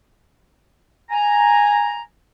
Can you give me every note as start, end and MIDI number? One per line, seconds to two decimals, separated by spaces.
1.10 2.01 80
1.10 2.01 82